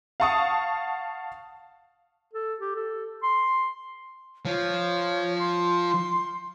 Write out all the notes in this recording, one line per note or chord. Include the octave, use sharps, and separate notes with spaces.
F5 F#5 A5 C#6 D#6
A4
G4
A4
C6
F3 C#5
C6